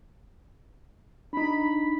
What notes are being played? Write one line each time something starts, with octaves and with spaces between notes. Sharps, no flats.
D4 D#4 B5